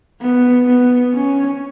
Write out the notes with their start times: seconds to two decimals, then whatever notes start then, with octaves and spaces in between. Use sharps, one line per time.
0.21 B3
0.67 B3
1.14 C#4